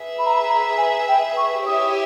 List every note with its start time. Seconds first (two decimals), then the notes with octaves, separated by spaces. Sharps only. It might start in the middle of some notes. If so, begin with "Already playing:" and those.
Already playing: G#4 B4 E5
0.19 B5
0.26 A#5
0.34 B5
0.49 A#5
0.78 G#5
1.08 G5
1.37 C#6
1.66 E4 G4 C#5 E5 G#5 D#6